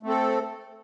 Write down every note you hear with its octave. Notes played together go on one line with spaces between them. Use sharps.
A3 C4 A4